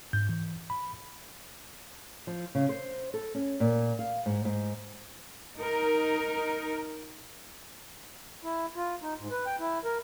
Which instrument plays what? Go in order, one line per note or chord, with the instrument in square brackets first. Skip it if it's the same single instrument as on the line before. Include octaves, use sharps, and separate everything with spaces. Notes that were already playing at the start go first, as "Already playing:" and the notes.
[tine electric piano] G#2 G6
E3
B5
[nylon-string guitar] F3
C#3
C5
A4
C#4
A#2
F5
G#2
G#2
[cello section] D#4 A#4
[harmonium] E4
F4
D#4
G#2
B4
G5
E4
A#4